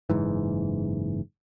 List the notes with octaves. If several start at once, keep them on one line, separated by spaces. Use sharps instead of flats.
F#1 G#2 E3